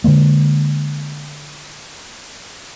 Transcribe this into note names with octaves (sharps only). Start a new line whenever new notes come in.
D3 E3 G#3 A#3